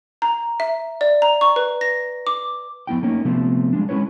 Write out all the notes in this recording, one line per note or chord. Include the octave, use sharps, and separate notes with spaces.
A#5
E5
D5
A#5
C#6
B4
A#6
D6
F2 B3 E4 G5
A3 A#3 C#4 D#4
C3 F3 A3 B3 C4
G3 G#3 D4
G#3 C#4 E4 B4 C#5